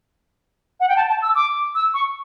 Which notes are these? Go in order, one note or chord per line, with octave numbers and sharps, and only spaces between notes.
F#5
G5
A5
A5
E6
D6
E6
C#6